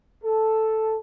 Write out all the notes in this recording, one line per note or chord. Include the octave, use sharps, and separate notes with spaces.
A4